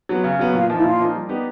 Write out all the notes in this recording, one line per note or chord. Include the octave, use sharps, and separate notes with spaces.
F#3 B3
C#3
F#3 B3
A#2 F4
F3 A#3 D#4
E4
A#2 F4
F3 A#3 D#4
G3
B3 D#4 G4